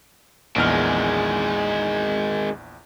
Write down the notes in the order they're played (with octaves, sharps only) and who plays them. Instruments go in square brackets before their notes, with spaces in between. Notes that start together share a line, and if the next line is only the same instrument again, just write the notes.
[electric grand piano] A#1 E2 F6 [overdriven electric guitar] D#3 G#3